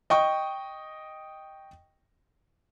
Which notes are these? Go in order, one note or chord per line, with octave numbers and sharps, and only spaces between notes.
D#5 G5 C#6 D#6